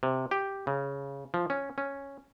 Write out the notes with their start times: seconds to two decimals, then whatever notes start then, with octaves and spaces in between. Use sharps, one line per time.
0.03 C3
0.31 G4
0.67 C#3
1.34 F3
1.50 C#4
1.78 C#4